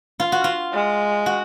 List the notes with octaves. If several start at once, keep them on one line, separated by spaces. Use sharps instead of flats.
F4
F#4
F4
G#3
F#4